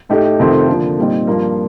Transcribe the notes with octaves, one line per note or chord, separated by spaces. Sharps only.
A2 A3 D#4 G4
F2 C3 D#3 A3 C4
D3 F3 A#3
A#2 G3 C4 D#4
G2 F3 A#3 F4